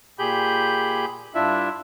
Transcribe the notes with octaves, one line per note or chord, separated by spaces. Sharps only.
A#2 G4 G#4 B5 G6
G2 D4 E4 F4 E5